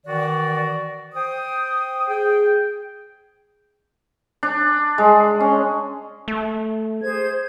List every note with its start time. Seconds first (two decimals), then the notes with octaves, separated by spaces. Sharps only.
0.06 D#3 E3 F#4 D5
1.15 C5 G5 D#6
2.08 G#4 G5
4.43 D4
4.98 G#3
5.40 C#4
6.28 A3
7.03 G#4 C5 G#6